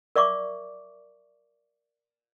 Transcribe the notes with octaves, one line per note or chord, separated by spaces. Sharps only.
A#4 D5 E5 C#6 D6